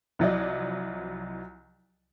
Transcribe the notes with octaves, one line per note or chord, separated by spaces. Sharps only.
C2 F3 F#3 E4 D5 D#5